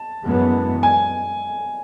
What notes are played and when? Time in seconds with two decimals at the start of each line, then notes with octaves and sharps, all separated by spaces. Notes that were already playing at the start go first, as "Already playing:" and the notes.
Already playing: A5
0.26 F#2 E3 G#3 B3
0.83 G#5